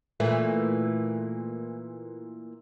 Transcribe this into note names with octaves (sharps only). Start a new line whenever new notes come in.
A#2 E3 A3